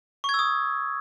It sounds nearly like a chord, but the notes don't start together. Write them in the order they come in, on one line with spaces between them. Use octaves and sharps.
C#6 G#6 E6 D#6